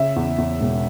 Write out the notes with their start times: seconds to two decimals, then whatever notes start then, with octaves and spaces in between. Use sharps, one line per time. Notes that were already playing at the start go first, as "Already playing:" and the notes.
Already playing: C#3 E5
0.16 E2
0.38 E2
0.61 E1